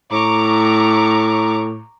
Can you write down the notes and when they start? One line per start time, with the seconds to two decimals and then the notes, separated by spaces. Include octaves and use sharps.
0.12 A2 A#5 C#6 D6